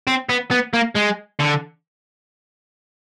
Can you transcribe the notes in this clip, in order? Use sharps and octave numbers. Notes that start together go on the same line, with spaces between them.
C4
B3
B3
A#3
G#3
D3